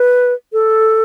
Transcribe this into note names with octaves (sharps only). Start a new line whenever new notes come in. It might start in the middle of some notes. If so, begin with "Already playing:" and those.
Already playing: B4
A4